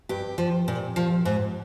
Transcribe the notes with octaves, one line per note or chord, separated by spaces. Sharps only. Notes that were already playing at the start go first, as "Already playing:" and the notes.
G2 G4
F3
A#2
F3
G#2